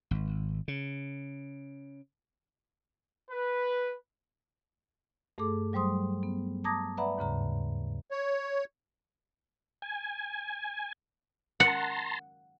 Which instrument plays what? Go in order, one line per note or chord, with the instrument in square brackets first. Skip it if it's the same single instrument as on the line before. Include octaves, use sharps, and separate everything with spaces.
[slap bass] G#1
C#3
[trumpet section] B4
[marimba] G2 A3 G#4 A4 D6
F#3 G3 C5 C6 D#6
B3
A5 A#5 D6 D#6 G#6 A#6
B4 D5 E5 F#5 A#5 B5
D#2 G#2 C#3 A#5
[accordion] C#5
[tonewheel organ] G#5
[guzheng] F#5 [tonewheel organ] A5 A#5 C6